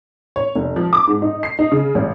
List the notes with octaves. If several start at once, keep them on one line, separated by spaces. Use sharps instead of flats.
C#5
F1
F3
D6
G#2
D#4
C7
D#4
C#3
A1